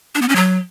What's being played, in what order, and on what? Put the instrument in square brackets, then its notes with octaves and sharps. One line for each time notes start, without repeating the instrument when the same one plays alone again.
[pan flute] D4
B3
C#4
F#3